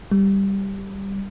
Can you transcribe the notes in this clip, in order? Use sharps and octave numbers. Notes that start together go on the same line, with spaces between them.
G3